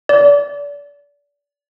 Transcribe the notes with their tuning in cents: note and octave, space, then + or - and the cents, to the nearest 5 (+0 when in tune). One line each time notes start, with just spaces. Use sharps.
D5 -30